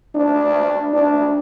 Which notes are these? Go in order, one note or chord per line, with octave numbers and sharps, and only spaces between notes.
D4
D4